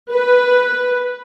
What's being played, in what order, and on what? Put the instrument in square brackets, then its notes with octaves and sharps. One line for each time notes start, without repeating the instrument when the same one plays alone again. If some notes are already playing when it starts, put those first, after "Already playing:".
[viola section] B4